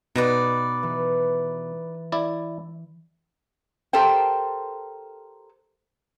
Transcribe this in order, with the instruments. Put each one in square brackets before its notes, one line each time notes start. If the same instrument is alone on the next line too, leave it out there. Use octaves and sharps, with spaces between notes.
[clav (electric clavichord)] B2 [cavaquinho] D#4 B4 D5
[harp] E3
[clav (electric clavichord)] E4 D5
[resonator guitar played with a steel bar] G4 A4 A#4 C5 G5